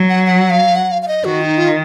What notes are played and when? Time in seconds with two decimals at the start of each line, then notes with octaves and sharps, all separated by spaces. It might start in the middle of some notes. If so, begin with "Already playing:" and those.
Already playing: F#3
0.09 F#5
0.26 F#5
0.50 F5
0.75 F#5
0.91 F5
1.02 F5
1.08 D#5
1.24 D#3 F#4
1.41 D#4
1.57 F4